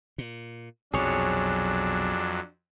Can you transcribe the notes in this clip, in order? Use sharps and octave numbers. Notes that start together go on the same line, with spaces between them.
A#2
B1 F2 C3 F#3 D4 G#4 C#5